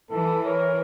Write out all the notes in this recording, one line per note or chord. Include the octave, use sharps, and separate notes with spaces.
E3 A4
A#4 C#5